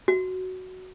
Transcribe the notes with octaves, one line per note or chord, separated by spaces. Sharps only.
F#4